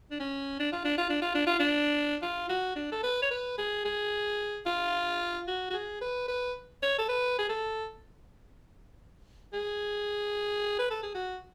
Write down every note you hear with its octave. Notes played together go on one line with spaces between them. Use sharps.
D4
C#4
D4
F4
D4
F4
D4
F4
D4
F4
D4
F4
F#4
D4
A4
B4
C#5
B4
G#4
G#4
F4
F#4
F#4
G#4
B4
B4
C#5
A4
B4
G#4
A4
G#4
B4
A4
G#4
F#4